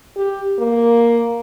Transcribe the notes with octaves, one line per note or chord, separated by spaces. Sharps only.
G4
A#3